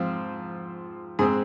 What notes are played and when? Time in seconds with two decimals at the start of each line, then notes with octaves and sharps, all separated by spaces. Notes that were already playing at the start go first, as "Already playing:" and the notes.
Already playing: G#2 F3 C4 F4
1.19 G#2 G#3 C4 G#4